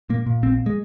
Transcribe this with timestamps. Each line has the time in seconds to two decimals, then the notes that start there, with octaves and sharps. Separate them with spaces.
0.10 A#2 A#3
0.26 A#2
0.43 A#1 C4
0.66 G#3